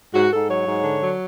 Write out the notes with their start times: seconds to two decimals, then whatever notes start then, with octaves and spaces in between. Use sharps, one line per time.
0.14 G#2 F#4
0.32 G#2 A4
0.49 F#3 C#5
0.67 G#2
0.83 D3
1.01 F#3